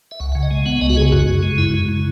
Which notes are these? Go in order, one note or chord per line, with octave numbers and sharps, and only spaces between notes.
E5
C#2 F#5
F#5
C#3
D#5
G#3
B3 F#5
C#2 D#5
F#4
C#3 G#4
F#2 F#4
C#3
G#3
F#2 E4
F#2
C#3